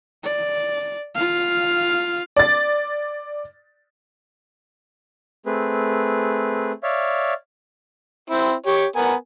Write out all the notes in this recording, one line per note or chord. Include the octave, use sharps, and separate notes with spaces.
D5
F4 F5
D5 A6
A3 C4 G#4 B4
C#5 D5 E5 F5
C4 E4
G4 C#5
B3 A#4 G#5